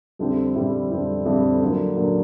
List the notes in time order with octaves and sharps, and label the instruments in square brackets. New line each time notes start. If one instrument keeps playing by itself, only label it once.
[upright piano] F2 D3 G3 C4 E4
F2 D3 G3 C4 E4
F2 D3 G3 C4 E4
F2 D3 G3 C4 E4
D3 F#3 A#3
D3 F#3 A#3